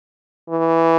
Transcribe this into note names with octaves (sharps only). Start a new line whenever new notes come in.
E3